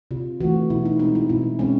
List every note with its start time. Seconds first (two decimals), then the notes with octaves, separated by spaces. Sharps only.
0.11 C3 F4
0.41 E3 A3 F#4
0.70 B2 E4
0.85 D#4
0.99 G#3 C4 D#4
1.15 E4
1.29 B2 E4
1.59 G#3 C4 C#4